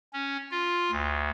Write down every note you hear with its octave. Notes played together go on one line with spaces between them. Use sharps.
C#4
F4
D2